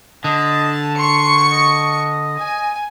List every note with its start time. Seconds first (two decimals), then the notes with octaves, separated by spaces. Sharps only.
0.24 D3 D#5 A5
0.98 C6 C#6 C#7
1.51 D#5
2.38 G#5